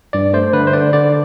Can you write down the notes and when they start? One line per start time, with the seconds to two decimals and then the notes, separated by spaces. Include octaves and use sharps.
0.13 G2 D5
0.33 A3 C5
0.53 D3 B4
0.67 C5
0.73 D3 D5
0.93 D3 D5